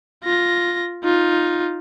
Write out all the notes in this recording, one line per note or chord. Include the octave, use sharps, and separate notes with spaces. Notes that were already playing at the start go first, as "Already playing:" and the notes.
F4 A#6
D#4 F4